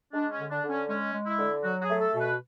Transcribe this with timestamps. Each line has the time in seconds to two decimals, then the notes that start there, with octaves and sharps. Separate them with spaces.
0.13 G#3 D4
0.31 C#4
0.38 D3
0.51 D4
0.63 D3
0.70 C#4
0.89 G#3 C#4
1.13 G#3
1.26 E4
1.39 D3
1.64 F#3 F#4
1.79 F#4
1.83 G#4
1.89 A3
2.01 A4
2.14 B2
2.21 B4